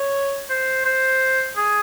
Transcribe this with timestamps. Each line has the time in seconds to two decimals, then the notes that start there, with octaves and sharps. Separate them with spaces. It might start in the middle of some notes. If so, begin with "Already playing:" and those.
Already playing: C#5
0.50 C5
0.85 C5
1.57 G#4